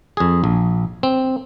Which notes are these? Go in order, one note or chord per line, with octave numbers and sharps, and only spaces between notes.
F2 G#4
A#1
C4